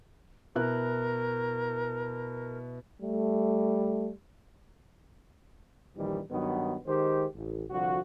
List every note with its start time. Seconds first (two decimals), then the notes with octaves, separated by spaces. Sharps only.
0.56 B2 E4 A#4 F#6
3.02 G3 A3
5.96 A#1 D#2 D#3 E3 G3
6.31 G2 D#3 F#3 B3
6.86 D#3 G#3 G4 C5
7.35 A1
7.70 C2 D3 F3 F#4